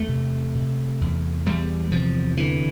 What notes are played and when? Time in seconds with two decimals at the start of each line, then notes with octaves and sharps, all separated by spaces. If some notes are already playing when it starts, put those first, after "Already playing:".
Already playing: E2 A3
0.09 C3
0.55 C3
1.01 E2
1.46 E2 G3
1.92 C3 F3
2.37 D3 E3